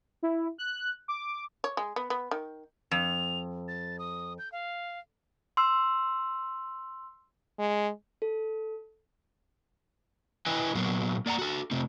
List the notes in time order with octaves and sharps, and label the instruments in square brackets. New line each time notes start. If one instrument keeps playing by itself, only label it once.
[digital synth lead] E4
F#6
D6
[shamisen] C#5
G#3
B3
B3
D#3
[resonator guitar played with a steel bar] F2 [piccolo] F7
[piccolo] A6
D#6
G6
F5
[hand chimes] C6 E6
[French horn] G#3
[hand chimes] A4
[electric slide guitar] E4 B4 D#5 G5 G#5
A#2 F#3 A#3 B3 F#4
A#3 D5 F#5 A#5
F#4 A4
C3 A3 C4